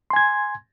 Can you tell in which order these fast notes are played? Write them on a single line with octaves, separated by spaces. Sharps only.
C6 G#5 G#6